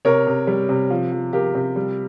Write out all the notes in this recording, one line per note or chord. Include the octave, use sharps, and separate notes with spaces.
C3 A#4 C#5
C3
G3
C3
F3
F3
F3 G4 A#4
C3
G3